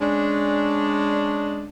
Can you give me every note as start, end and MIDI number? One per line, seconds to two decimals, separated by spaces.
0.01 1.69 56
0.01 1.69 61
0.01 1.69 62